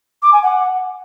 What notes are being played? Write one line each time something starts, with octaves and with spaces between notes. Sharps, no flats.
D6
G#5
F#5